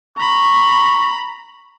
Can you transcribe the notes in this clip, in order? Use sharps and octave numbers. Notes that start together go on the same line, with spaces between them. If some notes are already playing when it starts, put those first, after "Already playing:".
A#5 B5 C#6